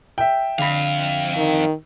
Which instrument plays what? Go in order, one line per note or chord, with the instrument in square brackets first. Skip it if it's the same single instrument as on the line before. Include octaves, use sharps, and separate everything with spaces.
[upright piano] E5 G5
[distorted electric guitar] F2 F5 [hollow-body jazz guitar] D3 B5
[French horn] D#3